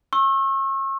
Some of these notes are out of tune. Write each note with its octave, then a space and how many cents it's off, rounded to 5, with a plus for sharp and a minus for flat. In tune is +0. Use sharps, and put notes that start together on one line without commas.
C#6 -35 E6 +0